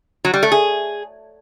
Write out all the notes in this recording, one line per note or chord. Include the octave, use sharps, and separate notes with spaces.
F#3
G3
A3
G#4